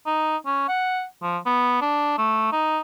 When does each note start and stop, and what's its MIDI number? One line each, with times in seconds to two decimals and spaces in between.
0.06 0.37 63
0.46 0.69 61
0.69 1.05 78
1.22 1.38 53
1.46 1.78 59
1.81 2.16 62
2.18 2.49 57
2.52 2.80 63